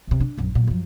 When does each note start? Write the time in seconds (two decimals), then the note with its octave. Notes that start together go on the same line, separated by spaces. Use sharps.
0.07 C2 C3
0.20 D4
0.38 A#1 F#2
0.55 A#2 F#3
0.68 F#2 F3